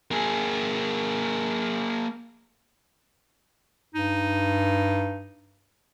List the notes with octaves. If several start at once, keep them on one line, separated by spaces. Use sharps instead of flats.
A#3 G#4
G2 D#4